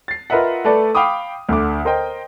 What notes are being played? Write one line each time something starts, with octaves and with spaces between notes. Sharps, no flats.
A6 C7
F4 A#4 B4 D#5 E5 F#5
A3 A4 B4 D5
F5 G5 B5 D6 D#6
D2 D3 D6
A#4 C5 D#5 G5